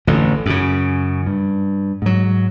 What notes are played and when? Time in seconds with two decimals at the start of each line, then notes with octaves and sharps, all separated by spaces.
0.07 A1 F2 D3
0.46 F#2 C#3
1.26 G2
2.02 G#2 F#3